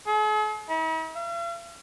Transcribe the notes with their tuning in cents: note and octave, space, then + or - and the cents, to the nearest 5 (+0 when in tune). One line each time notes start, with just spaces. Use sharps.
G#4 +45
E4 -45
F5 -45